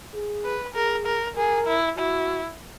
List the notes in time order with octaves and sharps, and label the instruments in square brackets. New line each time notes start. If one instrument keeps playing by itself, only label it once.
[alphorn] G#4
[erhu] B4
[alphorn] G#4 [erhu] A#4
[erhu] A#4
[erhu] G#4 [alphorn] A#4
[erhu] E4
[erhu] E4 [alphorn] F#4